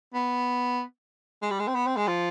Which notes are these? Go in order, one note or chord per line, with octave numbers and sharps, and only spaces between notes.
B3
G#3
G3
G#3
C4
B3
C4
G#3
F3